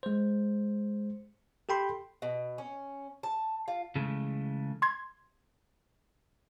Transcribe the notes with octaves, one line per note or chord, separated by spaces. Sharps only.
G#3 C5
G4 A4 G5 B5 C6
B2
C#4
A5
F4
C#3 E3 G#3 A3
C6 G#6